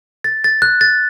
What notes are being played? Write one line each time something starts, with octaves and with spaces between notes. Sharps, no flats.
A6
A6
F#6
A6